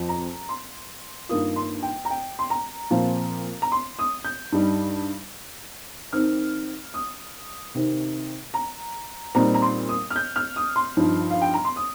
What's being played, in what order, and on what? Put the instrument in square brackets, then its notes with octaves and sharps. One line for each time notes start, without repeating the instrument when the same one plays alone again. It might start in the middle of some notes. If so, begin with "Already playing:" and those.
Already playing: [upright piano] F2 F3 C4 F4
A#5
C6
G2 D#3 A#3 F4 D#6
C6
G5
A#5
G5
C6
A#5
A#2 F3 C4 F4
A#5
C6
D#6
G6
G2 G3 D#4
D#3 C4 D#4 F6
D#6
C3 D#3 C4 D#4
A#5
A#2 G3 C4 D#4 A#5
A#5
C6
D#6
F6
G6
F6
D#6
C6
G2 F3 D#4
F5
G5
A#5
C6
D#6